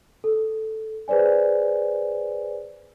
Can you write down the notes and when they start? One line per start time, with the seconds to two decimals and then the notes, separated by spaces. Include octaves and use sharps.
0.24 A4
1.08 G#4 B4 C5 D5 G#5